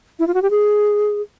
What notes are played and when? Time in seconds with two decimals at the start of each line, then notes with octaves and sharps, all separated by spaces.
0.19 E4
0.27 F4
0.34 F#4
0.42 G4
0.51 G#4